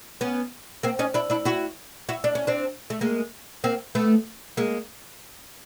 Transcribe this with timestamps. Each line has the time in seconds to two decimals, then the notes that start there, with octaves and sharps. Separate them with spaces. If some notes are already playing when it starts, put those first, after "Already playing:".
0.21 B3 C#4
0.83 A#3 C4
0.99 C#4 D#4
1.14 D4 E4
1.30 D4 E4
1.45 E4 F#4
2.09 E4 F#4
2.24 D4
2.35 C#4
2.47 C4 D4
2.90 A3
3.01 G#3 A#3
3.64 A#3 C4
3.95 A3 B3
4.57 G#3 A#3